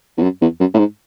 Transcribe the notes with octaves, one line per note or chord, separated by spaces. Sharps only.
E2
F#2
E2
F#2
A2
G#2